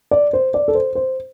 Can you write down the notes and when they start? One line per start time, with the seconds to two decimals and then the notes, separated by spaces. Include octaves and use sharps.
0.11 D5
0.33 C5
0.54 D5
0.68 A4
0.75 C5
0.95 C5